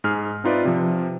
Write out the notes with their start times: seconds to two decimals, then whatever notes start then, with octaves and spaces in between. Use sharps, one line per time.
0.04 G#2 G#4 F6
0.44 C4 D#4 F4 B4 D5 E5
0.65 C3 F3